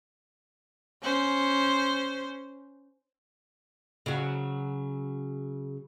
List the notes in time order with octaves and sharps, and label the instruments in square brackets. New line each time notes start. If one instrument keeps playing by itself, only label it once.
[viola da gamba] C#4 C5
[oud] C#3 F#3